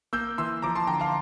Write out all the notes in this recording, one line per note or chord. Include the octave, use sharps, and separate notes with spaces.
A#3 E6 G6
E3 C6 E6
F3 A#5 D6
A5 C6
D3 G5 A#5
F5 A5